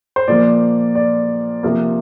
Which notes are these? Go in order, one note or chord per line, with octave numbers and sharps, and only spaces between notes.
C5
A#2 F3 A#3 D5
D5
C3 F3 A#3